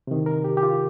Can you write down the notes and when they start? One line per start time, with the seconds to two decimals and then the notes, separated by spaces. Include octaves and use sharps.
0.07 C3 D#3
0.26 A#4
0.44 G4
0.57 G4
0.63 F4